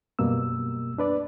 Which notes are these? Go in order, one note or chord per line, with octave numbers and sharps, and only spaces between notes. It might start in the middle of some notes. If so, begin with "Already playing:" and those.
F#2 B2 G3 A#3 E6
D4 B4 D5